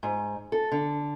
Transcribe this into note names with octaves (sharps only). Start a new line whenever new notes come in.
G#2
A4
D3